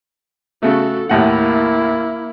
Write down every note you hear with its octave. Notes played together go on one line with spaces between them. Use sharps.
C#3 A3 F#4 A4
D#2 A2 A#3 E4 F#5